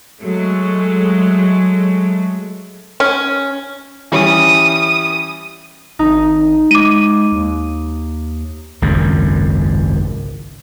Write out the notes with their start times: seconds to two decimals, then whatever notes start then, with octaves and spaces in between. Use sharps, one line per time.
0.22 F#3 G#3 A3
3.00 C#4
4.12 E3 G3 C#4 D#6
5.99 G#1 D#4
6.71 G#3 D6 D#7
7.32 D#2
8.82 G#1 C#2 F#2